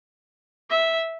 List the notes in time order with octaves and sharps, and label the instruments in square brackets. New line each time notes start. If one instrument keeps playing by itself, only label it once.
[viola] E5